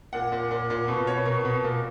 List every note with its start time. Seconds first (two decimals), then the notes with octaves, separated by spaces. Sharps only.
0.13 A#2 F#5
0.32 A#2
0.51 A#2
0.70 A#2
0.88 B2
1.07 B2 C#5
1.25 B2 A#4
1.45 B2
1.64 A#2